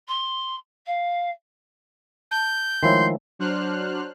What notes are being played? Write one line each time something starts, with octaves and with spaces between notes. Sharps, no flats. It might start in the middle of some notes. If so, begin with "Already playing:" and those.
C6
F5
A5 G6
D#3 F3 G#3 A3 E4 C#5 C6
F#3 D4 C5 F6 F#6